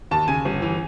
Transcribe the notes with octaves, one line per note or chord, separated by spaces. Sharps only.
D#2 A5
C#3 G#5
G1
E3